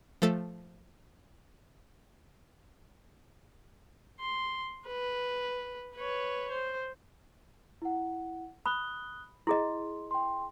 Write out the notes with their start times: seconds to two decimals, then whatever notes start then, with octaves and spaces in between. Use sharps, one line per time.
0.22 F3 A3 A4 A6
4.20 C6
4.88 B4
5.96 B4 C#5
6.51 C5
7.82 E4 F#5
8.66 B5 D#6 F#6 G7
9.47 E4 G#4 D#5 C6
10.11 G5 C6